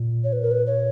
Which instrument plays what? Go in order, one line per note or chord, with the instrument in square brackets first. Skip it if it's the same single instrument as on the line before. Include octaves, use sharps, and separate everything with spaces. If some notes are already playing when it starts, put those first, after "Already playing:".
Already playing: [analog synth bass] A#2
[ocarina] C#5
B4
A#4
B4
C#5